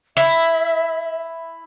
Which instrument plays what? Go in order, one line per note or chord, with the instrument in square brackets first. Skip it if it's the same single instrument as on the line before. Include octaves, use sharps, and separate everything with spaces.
[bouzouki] E4 [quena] E5